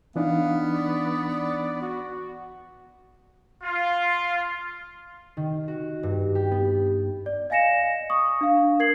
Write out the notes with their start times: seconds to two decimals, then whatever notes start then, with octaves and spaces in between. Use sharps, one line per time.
0.16 E3 B3 D4 D#4 F5
0.72 D5
1.82 F#4
3.63 F4
5.37 D#3
5.68 F#4
6.03 G2
6.35 G4
6.51 B3
7.26 D5
7.50 D#5 F5 G#5 A#6 C#7 E7
8.10 C#6 D#6
8.41 D4 F5
8.79 A#4 G#6 C7 F#7